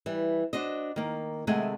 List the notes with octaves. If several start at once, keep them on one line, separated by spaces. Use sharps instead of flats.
E3 G3
D4 F#4 C5 D#5
D#3 A#3
C3 D#3 G#3 A3 F#5 G#5